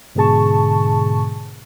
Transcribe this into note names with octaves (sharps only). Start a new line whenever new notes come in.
G#2 B2 D3 G#4 A5 C#6